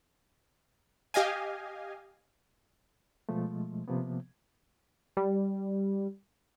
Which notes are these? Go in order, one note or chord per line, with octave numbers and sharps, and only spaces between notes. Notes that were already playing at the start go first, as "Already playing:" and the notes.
G4 D#5 F5 G#5
B2 F3 G#3 A3
C3 F3 A#3 B3
G3